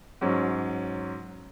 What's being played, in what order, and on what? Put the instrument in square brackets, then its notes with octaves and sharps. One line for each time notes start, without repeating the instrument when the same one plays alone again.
[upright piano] G#2 F#3 C#4